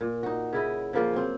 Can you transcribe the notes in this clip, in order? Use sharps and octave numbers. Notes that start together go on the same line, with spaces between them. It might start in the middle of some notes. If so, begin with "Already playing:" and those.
A#2
D#4 F#4
C#3 E4 D#5
C#3 F3 A#3 F4
F#3 C4